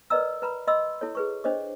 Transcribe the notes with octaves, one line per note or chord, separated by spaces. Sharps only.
A#4 B4 D5 D#5 A#5 E6
B4 A#5 B5
D#5 B5 C6 E6
E4 A4 C#5
G#4 B4 C#6
D4 C5 C#5 D#5 D6